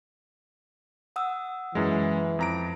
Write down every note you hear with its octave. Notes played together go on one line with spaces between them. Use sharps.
F#5 D#6 E6
F#2 E3 G#3
F2 A#5 D7